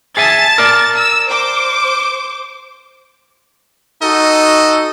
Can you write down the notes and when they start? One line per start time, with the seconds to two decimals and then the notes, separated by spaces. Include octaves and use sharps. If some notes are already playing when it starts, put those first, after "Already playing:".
0.17 G#4 E5 G#5 A5 A6
0.58 A#4 D5
0.96 E6
1.28 C5 D6
4.02 D#4 F#4 A4 D#5